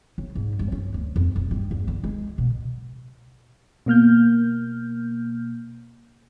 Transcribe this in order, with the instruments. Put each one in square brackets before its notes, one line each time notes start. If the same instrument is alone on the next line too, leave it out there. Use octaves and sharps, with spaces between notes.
[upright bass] C#3
G#2
G2
C#4
D2
F2
D#1
G2
E2
D3
G#3
B2
[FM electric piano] B2 A#3 F6 G6